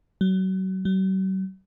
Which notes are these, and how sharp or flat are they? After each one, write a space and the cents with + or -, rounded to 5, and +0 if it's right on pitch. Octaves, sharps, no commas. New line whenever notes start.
F#3 +30
F#3 +45